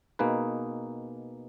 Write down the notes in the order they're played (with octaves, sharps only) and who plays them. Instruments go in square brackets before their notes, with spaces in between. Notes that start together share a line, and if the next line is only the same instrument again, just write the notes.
[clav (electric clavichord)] B2 A#3 D#4 G#4 B4